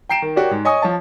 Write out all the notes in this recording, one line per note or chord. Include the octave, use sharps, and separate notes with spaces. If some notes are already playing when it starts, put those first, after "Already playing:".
G5 A#5 C7 D7 E7
D#3
F#4 G4 A#4 C#5 D5
G#2
C#5 D#5 G#5 C#6 D#6
F3 C#5 A5